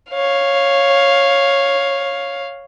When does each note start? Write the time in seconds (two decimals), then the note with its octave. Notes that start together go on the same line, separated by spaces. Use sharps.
0.12 C#5 F5